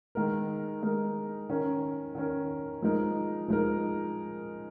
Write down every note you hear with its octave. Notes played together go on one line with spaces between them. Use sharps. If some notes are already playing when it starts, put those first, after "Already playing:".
D#3 G#3 D#4 A#4
D#3 G#3 D#4 A#4
D#3 C#4 A#4
D#3 C#4 A#4
F3 G#3 D#4 A#4
F3 G#3 D#4 A#4